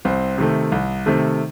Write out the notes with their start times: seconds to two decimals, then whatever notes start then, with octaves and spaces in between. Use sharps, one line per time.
0.05 C2 C4
0.38 C3 D#3 A3
0.72 C2
1.06 C3 D#3 A3